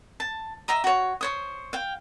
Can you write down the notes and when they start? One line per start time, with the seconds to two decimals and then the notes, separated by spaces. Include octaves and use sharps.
0.20 A5
0.68 D#5 E5 A#5 D#6
0.84 F#4 C#5
1.21 C5 C#5 D#6
1.73 F5 G5